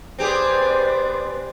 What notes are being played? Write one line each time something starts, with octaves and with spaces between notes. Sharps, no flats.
C4 G4 G#4 B4 C5 D5